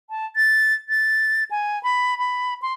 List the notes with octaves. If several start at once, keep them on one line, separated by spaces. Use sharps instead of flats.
A5
A6
A6
G#5
B5
B5
C6